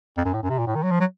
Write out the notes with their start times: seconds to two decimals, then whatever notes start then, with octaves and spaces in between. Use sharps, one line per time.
0.18 F2
0.25 F#2
0.33 A2
0.43 F#2
0.50 C3
0.59 A#2
0.67 A2
0.75 D#3
0.83 F#3
0.91 F3
1.00 F#3